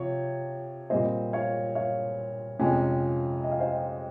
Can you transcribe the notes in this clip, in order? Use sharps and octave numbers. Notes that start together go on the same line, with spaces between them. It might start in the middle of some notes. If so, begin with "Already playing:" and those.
Already playing: C3 F3 C#5
A#2 G3 C4 C5 D#5
C#5 F5
C#5 F5
F2 C3 F3 G#3 C#4
D#5
F5
C5 D#5